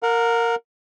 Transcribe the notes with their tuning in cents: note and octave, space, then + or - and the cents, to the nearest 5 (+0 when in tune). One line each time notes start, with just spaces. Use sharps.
A#4 -10 F#5 -45